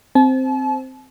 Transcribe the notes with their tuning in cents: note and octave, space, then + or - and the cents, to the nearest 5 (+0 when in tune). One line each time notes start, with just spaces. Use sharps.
C4 +0 A5 -40